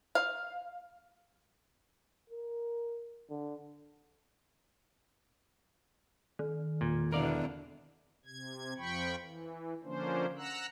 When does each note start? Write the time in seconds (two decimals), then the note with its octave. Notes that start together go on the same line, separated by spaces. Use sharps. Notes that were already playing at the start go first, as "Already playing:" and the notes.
0.15 F5
2.30 A#4
3.30 D3
6.39 D#3
6.81 E1 A#2
7.12 E2 B2 D3 A#4 D5 F5
8.25 C3 G#6
8.78 F2 F3 G5 B5 C#6
9.22 E3
9.84 D3 F3 A#3 C#4 D4 C5
10.38 F#5 A#5 E6 F#6